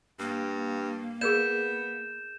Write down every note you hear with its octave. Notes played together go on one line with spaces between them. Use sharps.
G2 A#3
B3 G#4 A#4 D5 G6 E7